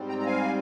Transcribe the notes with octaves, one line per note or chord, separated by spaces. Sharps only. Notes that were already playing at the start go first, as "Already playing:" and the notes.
Already playing: G#2 G3 C4
G5 A#5
A#5
F5 G#5